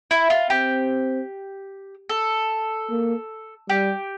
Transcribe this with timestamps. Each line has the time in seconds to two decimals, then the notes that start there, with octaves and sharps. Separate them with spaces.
0.11 E4
0.30 F4
0.50 C4 G4
2.09 A4
2.90 A#3
3.69 G3 G4